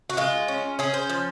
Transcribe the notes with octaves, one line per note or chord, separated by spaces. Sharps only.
F#4
G#3 F4
C#4
C#4 G#4
C5
F3